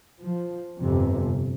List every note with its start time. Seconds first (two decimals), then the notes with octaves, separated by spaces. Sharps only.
0.20 F3
0.78 G1 F2 C3